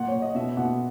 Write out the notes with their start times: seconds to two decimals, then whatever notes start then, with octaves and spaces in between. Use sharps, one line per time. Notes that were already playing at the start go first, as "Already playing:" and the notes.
Already playing: A#2 F#5
0.08 C#5
0.14 A#2
0.22 D#5
0.35 B2 E5
0.57 B2 F#5